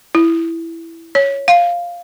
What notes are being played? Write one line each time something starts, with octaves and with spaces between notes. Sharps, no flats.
E4
C#5
F5